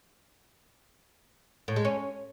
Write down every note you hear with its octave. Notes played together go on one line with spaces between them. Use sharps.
A2
G#3
C#4